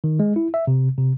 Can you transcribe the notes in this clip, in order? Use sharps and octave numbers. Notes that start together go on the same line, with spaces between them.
D#3
G#3
E4
E5
C3
C3